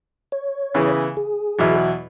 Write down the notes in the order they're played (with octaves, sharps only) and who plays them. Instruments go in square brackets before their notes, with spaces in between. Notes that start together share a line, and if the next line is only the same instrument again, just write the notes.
[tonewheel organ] C#5
[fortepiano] C#3 E3 B3 G#4
[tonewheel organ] G#4
[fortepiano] E2 B2 F#3 E4